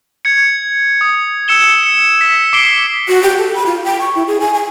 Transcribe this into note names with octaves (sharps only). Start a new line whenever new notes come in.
G#6 C#7
D#6
E6 C#7 E7 G7
C#7
B6
D6 C7 D7 G7
F#4
G4
A4
B5
F4
G5
C#6
E4
G#4
G#5
G#5